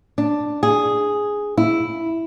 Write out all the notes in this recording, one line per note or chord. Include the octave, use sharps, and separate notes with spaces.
D4
G#4
E4